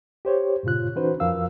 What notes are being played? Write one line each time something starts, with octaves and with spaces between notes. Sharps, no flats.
G4 C5 C#5
G2 A#2 C#3 F4 F#6
E3 C#4 D#4 F#4 B4 C5
F2 F3 A#4 F5 E6